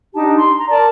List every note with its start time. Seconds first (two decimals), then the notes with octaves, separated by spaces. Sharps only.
0.15 D4 D#4 G4 A5
0.36 C6
0.58 A#5
0.69 A#4 D5 A5